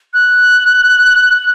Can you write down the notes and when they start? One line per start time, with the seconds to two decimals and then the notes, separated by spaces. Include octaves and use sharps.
0.14 F#6